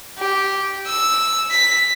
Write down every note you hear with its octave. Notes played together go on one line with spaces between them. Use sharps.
G4
E6
B6